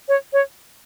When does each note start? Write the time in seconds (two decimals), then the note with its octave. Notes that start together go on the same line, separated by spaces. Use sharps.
0.08 C#5
0.33 C#5